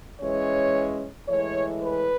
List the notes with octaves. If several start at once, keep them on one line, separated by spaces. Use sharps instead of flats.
E3 G#3 C#4 C#5
A2 E3 G#3 C#5
B4